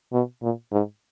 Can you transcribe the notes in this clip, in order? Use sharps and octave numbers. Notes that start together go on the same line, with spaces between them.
B2
A#2
G#2